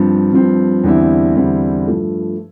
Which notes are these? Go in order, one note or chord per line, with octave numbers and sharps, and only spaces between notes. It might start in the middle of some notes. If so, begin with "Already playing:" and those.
Already playing: G2 F3 C4
G2 F3 C4
E2 D3 G3 C4 E4
E2 D3 G3 C4 E4
G2 F3 A3